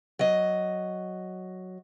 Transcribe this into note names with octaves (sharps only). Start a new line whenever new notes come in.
F#3 D#5